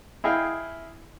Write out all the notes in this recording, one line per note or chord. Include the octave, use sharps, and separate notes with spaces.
E4 G#4 D#5 F5 G5